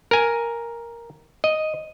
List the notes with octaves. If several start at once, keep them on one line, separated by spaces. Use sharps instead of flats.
A#4 G#5
D#5